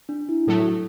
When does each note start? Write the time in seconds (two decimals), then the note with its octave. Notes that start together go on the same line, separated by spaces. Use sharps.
0.09 D4
0.29 E4
0.47 A2 F#3 A3 A4